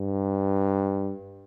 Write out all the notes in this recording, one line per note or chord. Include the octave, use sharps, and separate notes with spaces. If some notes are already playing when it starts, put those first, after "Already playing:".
Already playing: G2